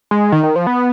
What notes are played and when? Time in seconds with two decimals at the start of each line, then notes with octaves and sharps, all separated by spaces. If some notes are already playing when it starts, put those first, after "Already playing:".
0.11 G#3
0.32 D#3
0.43 D#3
0.56 F3
0.67 B3